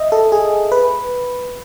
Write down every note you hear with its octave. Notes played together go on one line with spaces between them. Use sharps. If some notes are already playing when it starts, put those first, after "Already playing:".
Already playing: D#5 E5
A4
G#4
B4